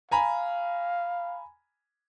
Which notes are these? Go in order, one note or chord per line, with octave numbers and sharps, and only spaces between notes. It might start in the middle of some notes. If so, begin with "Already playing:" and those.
F5 G#5 A#5 B5